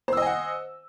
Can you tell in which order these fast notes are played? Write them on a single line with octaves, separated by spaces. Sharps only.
C5 E6 D#5 G#5 F#5